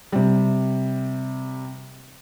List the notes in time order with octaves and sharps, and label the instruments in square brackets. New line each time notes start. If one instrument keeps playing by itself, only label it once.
[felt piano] C3 G3